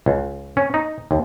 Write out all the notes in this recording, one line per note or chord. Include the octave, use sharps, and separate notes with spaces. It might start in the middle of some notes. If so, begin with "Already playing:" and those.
C#2
C#4
D#4
D#2